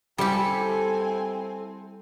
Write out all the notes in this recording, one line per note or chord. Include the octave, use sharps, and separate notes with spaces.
G3 C4 E4 G4 A4 G#5